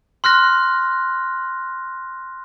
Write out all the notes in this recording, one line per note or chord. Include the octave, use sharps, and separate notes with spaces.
C6 F6 F#6 A#6